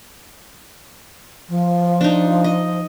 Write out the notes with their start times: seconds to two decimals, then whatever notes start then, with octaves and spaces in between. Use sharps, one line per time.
1.49 F3
2.01 D4 D#4
2.44 D#5